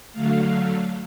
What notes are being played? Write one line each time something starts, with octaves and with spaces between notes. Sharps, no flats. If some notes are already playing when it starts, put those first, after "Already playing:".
D3 F#3 A3 F5